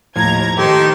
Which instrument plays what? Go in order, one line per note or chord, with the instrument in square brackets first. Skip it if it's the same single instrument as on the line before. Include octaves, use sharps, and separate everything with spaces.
[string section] D#2 A#5 G#6 [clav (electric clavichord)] A2 F3
[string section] D#3 [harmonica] D#4 A4 C5 [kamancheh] G4